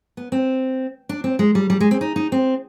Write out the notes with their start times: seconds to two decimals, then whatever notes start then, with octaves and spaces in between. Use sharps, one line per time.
0.17 B3
0.32 C4
1.09 D4
1.24 C4
1.39 G#3
1.55 G3
1.70 G3
1.80 G#3
1.91 C4
2.01 D#4
2.16 D#4
2.32 C4